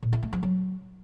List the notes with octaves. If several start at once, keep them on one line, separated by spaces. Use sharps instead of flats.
A#2
E4
A3
F3
F#3